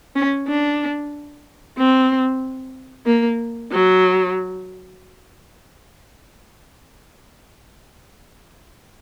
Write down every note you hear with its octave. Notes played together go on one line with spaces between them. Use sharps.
C#4
D4
C4
A#3
F#3